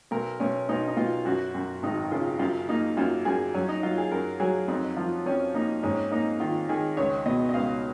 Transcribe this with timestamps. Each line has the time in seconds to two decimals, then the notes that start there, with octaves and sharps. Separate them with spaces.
0.11 B1 A#4
0.40 B1 C#4
0.69 B1 D#4
0.88 D#4
0.97 B1 F4
1.25 F#2 F#4
1.54 F#2
1.83 G#1 D#4
2.11 C#3 F4
2.39 F#2 F4
2.69 A#3 D#4
2.97 F#2 F4
3.25 F#2 G#4
3.54 F#3 C#4
3.69 D#4
3.83 F#3 F4
3.98 G#4
4.11 F#2 A#4
4.40 F#3 G#4
4.68 F2 D#4
4.97 F3 F4
5.26 F2 C#4
5.54 A#3 D#4
5.83 G#2 C#4
6.11 A#3 D#4
6.40 D#3 F4
6.69 D#3 G#4
6.97 C#2 C#5
7.26 B2 D#5
7.49 D#5
7.54 C#2 F5